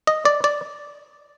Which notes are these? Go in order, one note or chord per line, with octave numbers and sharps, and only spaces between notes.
D#5
D5
D5